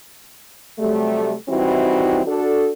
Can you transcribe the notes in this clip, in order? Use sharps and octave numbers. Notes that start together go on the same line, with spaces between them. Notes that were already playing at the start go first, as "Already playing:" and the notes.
C3 F#3 G3 A3
E3 G3 C4 D#4 E4 F#4
D4 F#4 A4